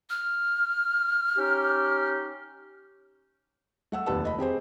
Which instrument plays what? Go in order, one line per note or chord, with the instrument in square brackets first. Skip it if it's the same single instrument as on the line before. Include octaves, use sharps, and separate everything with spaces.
[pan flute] F6
[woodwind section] C#4 D#4 G4
[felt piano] A3 F#5 E6
F1 D#2 G3 B4 A5 E6
D#5 B5
C4 G4 G#4 C5